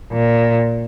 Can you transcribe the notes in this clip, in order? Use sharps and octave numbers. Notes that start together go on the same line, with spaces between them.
A#2